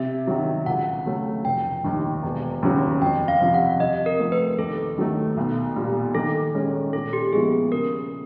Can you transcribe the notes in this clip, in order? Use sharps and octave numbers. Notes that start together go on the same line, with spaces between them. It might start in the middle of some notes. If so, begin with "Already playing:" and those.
Already playing: C3 E5
D#3 F#3
C#2 F#5
C#3 F#3 A3 C#4
F1 G5
D#2 D#3
E1
D#2 C#3 F#3
F2 G5
F5
C3 F3
F#5
C3 D#5
A#4
F3 A3
B4
D#2 A4
D#3 F#3 A3
B1
A#2 G3
D#3 A4
G#3 C#4
A#2 A4
G4
F3 G#3 B3 E4 G#4
C#3 A#4